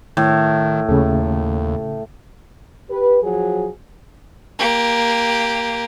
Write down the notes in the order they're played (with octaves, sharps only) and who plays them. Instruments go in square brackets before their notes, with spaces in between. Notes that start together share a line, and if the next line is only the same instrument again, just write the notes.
[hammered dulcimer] A2 [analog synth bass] D#3
[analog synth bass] D#2 [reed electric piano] C#3 A3
[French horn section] G4 B4
F3 F#3 G#4
[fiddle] A#3 G4